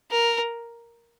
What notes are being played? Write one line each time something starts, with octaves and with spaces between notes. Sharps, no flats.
A#4